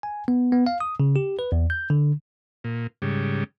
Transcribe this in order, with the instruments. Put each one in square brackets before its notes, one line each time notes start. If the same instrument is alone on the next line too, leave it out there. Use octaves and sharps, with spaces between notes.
[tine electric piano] G#5
B3
B3
F5
D#6
C#3
G4
B4
E2
G6
D3
[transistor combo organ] A#2
G#2 C#3 G3